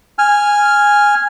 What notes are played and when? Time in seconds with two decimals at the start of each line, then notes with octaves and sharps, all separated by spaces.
0.18 G#5 F6